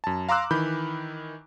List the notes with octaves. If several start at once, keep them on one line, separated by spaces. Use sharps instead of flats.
F#2 A5
F5 A#5 C6 D6 E6 F#6
D#3 E3 B5 G6